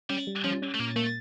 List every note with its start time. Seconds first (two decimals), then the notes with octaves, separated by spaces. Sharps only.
0.10 G3 C#4
0.27 G3
0.44 F3 C#4
0.62 C#4
0.74 A3
0.79 A#2 A#3
0.96 A3 A#3